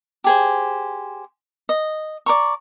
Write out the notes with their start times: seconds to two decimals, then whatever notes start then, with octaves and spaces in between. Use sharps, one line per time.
0.24 G4 G#4 C5
1.69 D#5
2.26 D5 A#5 C#6